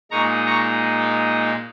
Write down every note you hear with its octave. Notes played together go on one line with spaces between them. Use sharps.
A#2 G#3 D#4 A#5 C#6
A#5 C#6